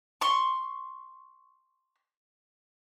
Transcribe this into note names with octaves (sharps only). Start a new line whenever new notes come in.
C6 C#6